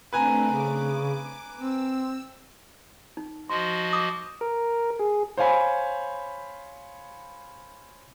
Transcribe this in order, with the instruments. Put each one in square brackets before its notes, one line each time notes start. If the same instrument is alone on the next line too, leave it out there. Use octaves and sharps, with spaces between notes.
[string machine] A3 C4 D4 [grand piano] B4 G#5 A#5
[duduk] C#3 [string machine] D6
[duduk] C4 [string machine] E6
[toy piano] D#4
[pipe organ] F3 F#4 D#5 [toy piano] C6
[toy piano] D6 D#6
[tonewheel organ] A#4
G#4
[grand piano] C5 C#5 F5 G#5 B5